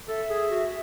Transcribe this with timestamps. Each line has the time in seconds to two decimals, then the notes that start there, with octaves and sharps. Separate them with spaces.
0.08 A4 E5
0.30 G#4
0.50 F#4